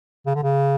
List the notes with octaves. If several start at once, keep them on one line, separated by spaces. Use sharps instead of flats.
C#3
D3
C#3